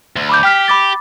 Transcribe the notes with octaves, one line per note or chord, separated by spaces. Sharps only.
D2
B5 D6 G6
G4 G5 F6 B6
B5 D6 A6